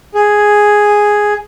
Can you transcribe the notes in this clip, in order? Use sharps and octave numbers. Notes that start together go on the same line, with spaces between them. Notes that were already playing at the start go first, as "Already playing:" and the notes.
G#4